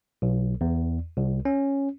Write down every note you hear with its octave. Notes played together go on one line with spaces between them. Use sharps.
B1
E2
C2
C#4